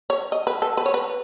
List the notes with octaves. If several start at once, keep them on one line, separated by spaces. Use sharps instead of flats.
C#5
D#5
B4
A4
B4
C#5
B4